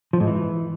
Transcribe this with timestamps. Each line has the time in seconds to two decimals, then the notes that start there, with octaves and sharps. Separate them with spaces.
0.13 F3
0.20 G#2
0.27 E3